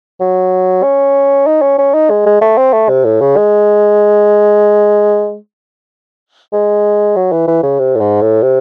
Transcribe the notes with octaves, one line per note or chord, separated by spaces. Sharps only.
F#3
C#4
D#4
C#4
C#4
D#4
G#3
G#3
A3
C4
A3
C3
A2
C#3
G#3
G#3
F#3
E3
E3
C#3
C3
A2
G#2
A2
C3